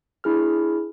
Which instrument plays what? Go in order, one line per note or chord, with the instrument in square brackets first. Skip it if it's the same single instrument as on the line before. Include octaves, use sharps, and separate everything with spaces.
[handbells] D4 E4 G#4 F6